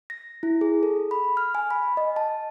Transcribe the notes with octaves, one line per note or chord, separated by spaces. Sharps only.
A#6
E4
G#4
A4
B5
F6
G#5
B5
D#5
A5